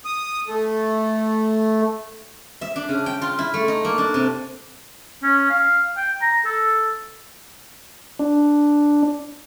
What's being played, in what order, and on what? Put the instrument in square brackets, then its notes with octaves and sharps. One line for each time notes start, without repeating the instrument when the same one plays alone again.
[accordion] D#6
A3
[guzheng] E5
D4
C#3
G5
F4
E4
A3
D#4
A#3
D4
C3
[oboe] C#4
F5
G5
A#5
A4
[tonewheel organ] D4